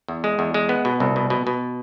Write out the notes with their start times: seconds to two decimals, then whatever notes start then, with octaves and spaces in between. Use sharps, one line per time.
0.08 E2
0.24 G#3
0.39 E2
0.54 G#3
0.69 B3
0.85 B2
1.00 C2
1.16 B2
1.30 B2
1.47 B2